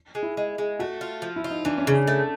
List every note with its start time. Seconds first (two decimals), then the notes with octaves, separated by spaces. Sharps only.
0.15 G#3
0.23 E4
0.37 G#3
0.58 G#3
0.79 A3 F#4
1.01 F4
1.22 F3
1.36 E4
1.44 F4
1.51 D#4
1.65 E3 D4
1.78 C#4
1.87 C#3 D4
2.07 A3